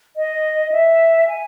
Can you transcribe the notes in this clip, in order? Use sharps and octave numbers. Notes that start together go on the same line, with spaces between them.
D#5
E5
G#5